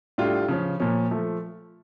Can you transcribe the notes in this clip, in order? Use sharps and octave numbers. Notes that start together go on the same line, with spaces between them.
A2 G3 D4 F4
C#3 F3 C#4
A#2 F3 C#4
F3 A3